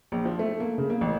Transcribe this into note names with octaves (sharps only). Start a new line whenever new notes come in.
A#1
F3
A3
A#3
C#3
A#3
A1